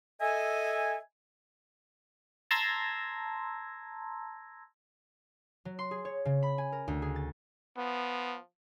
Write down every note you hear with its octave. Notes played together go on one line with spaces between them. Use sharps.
A4 D#5 E5 G#5
A5 A#5 C6 E6 G#6 A#6
F#3
C6
G#4
C#5
C#3
B5
G#5
A#4
D2
G#4
A6
F3 B3